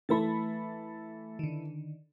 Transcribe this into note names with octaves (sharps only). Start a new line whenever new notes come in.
E3 A3 A4 E5 B5 A6
D3 D#3